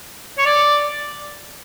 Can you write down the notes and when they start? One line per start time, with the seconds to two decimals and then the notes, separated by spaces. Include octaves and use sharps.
0.38 C#5
0.45 D5